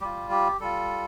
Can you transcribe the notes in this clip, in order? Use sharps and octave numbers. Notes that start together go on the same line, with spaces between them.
G3 F4 G4
G4
G3 F4 A4